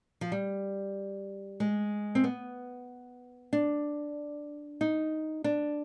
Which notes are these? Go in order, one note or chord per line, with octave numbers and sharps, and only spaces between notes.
F3
G3
G#3
C4
B3
D4
D#4
D4